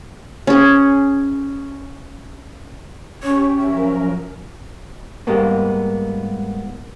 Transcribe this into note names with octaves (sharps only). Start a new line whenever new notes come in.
C#4 G#4
C#4 G4 C#5
F3 F#3 A#4 E5
G#2 G3 G#3 A#3 B3